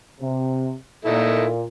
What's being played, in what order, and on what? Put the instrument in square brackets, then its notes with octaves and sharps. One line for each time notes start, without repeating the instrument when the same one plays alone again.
[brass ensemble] C3
[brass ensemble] A#2 [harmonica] D#4 E4 A4